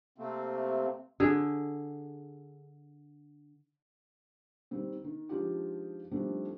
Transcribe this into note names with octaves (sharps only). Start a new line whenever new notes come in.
C3 A3 A#3 C4
D3 G#4
D#3 G3 C4
D#3
F3 G#3 D4 D#4 F4 G4
D#3 F3 G3 A3 C4 D4